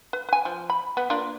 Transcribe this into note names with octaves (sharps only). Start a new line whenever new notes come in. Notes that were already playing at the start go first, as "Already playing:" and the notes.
B4
B4 G#5
F3
B5
B3
A#3 D4 F4